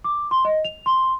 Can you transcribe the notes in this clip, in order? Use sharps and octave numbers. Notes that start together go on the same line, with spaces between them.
D6
C6
D#5
F7
C6